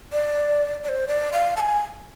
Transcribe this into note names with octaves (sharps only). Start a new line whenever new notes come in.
D5
D5
C5
D5
F5
A5
G#5